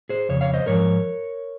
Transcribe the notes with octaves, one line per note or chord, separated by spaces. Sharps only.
G#4 C5
F2 C#3 C#5
C#5 F5
C5 D#5
G#2 F3 A#4 C#5